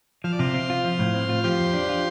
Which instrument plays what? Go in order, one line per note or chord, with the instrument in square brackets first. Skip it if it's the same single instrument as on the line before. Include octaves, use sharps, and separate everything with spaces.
[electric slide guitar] F3 [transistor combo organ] F5
[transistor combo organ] D5
[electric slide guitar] C3 [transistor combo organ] C5 F5
[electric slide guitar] C4
F4
F3
A2
C4
F4
[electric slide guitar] F3 [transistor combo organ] G4 C5
[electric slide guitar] F2
D4
F4